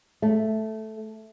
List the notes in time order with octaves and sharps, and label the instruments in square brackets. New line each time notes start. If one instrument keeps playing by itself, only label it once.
[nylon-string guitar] A3